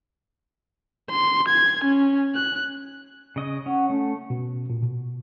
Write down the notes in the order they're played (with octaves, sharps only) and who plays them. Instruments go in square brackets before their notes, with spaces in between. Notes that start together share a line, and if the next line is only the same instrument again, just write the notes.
[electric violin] C6
G#6
C#4
F#6
[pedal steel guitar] C#3 D#5 D#6
[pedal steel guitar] C#4 [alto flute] F#5
[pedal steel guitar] A3 [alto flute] C#4
[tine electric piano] B2
A#2
B2